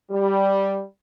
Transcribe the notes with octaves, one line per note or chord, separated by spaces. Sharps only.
G3